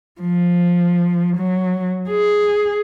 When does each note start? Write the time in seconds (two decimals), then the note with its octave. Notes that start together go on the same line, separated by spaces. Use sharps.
0.21 F3
1.37 F#3
2.10 G#4